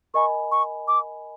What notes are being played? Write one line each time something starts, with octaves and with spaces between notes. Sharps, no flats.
A#4 D#5 G#5 B5 C#6
C#6
D6